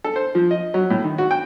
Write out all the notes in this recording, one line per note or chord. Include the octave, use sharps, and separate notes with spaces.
A4
C5
F3
D#5
F#3
A2
D#3
F#4
G5